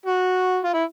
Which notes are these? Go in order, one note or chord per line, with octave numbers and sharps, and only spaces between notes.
F#4
F4
E4